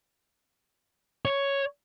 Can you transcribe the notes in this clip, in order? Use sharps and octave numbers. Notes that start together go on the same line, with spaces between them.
C#5